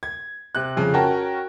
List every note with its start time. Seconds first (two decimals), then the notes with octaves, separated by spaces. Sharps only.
0.03 G#6
0.55 C3 F#6
0.77 F2 C#3
0.93 C#4 F#4 A#4 G5 A5